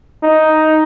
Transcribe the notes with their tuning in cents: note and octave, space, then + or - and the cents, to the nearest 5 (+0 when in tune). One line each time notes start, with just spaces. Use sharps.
D#4 +5